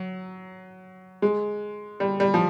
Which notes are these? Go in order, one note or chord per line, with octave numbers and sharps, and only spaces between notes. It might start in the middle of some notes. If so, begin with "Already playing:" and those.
Already playing: F#3
G#3
G3
G3
F3